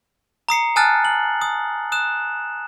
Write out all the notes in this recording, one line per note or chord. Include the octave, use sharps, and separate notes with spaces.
A#5 D#6 C7 C#7
G#5 A5 D#6 F6 F#6 A6
F#7
D#6
D#6 F#6 E7